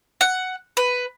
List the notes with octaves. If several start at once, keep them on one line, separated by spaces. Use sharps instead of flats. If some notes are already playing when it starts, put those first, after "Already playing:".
F#5
B4